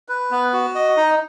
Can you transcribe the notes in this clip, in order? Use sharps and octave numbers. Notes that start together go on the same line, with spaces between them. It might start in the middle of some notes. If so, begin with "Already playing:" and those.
B4
B3
F#4
D#5
D#4